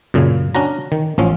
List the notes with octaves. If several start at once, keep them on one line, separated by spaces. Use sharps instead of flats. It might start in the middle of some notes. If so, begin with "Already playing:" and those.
F#2 A#2 C#3
C#4 D4 F#4 A#5
D#3
A1 F3 C#4